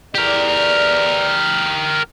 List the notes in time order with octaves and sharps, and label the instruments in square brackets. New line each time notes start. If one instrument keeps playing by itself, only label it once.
[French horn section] E2 D5 [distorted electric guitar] G4 A#4